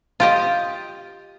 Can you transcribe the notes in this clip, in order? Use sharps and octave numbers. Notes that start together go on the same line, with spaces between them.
F4 G4 D#5